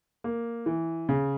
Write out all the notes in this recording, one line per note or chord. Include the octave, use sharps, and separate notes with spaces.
A#3
E3
C#3